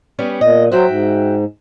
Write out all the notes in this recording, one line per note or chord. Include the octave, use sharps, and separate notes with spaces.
G3 B3 C#4
A#2 D#5
F#3 F#4 C5 E5 G5
G#2